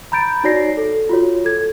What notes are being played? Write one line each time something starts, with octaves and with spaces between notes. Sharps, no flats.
A#5 B5 G6 A6 D7
D#4 F#4 C#5 D5 A#6 C7
A4
F4 F#4 C#5
A4 G#6